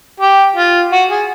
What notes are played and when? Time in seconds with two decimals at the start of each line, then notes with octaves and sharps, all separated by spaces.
0.20 G4
0.56 F4
0.92 F#4
1.10 G#4